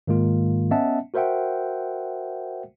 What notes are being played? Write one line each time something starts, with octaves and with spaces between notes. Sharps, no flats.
G#2 D#3 G#3 A#3 F4
B3 C#4 D#5 E5 F#5 A5
F#4 A#4 C5 E5 F#5 G5